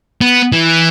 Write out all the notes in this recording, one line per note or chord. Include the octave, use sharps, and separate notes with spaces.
B3
E3